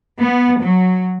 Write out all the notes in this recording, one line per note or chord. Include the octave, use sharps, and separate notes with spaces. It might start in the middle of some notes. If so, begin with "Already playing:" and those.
B3
F#3